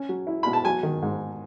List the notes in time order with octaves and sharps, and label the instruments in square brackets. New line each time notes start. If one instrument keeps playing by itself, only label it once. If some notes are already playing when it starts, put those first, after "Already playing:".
Already playing: [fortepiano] C#4
F#3
E4
B2 B5
A5
F#3 G#5
D#3
G#2